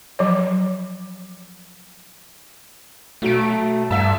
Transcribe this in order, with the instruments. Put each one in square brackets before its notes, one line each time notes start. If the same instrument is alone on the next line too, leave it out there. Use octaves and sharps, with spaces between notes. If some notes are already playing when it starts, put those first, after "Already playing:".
[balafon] F3 F#3 C#5
[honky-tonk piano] B1 F#3 D7 [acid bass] A3
[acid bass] G2 [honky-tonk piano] E5 A5